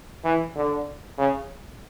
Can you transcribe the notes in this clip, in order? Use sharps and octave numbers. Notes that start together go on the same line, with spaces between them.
E3
D3
C#3